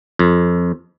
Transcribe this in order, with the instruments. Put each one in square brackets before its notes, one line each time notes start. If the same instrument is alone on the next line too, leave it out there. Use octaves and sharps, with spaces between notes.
[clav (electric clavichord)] F2